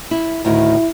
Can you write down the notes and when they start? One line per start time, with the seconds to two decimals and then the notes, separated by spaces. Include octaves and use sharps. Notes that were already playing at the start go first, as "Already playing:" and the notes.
0.11 E4
0.45 D2 A2 D#3 E4